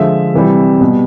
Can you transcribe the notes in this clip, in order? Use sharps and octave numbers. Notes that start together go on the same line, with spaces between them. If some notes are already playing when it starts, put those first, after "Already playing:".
Already playing: D3 F3 G#3 E5
C3 E3 G3
B2 G3